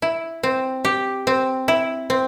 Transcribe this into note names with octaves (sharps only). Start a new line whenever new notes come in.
E4
C4
G4
C4
E4
C4